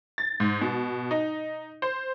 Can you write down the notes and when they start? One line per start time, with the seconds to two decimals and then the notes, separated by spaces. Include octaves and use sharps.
0.18 A6
0.40 G#2
0.61 B2
1.11 D#4
1.82 C5